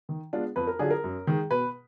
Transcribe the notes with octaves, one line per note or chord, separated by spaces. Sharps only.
D#3
G#3 B3 D4 F4
F2 B4
A#4
D3 F#3 D4 F4 G#4
A#4
F#2
D#3 G#3
B2 B4